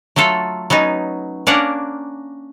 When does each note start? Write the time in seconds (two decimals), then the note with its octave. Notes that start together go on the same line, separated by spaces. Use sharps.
0.16 F#3 A3 F4 A4
0.70 F#3 B3 C#4 D#4
1.47 A#3 C#4 D4 A#4 F5 F#5